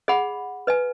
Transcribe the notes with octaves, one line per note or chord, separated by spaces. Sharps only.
G#4 D#5 F#5 B5
B4 D#5 G#5